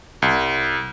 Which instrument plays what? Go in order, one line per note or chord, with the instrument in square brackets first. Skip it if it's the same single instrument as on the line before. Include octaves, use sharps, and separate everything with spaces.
[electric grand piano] C2